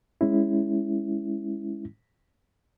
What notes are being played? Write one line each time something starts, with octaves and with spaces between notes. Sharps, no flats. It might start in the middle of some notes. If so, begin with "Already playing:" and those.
G#3 C#4 E4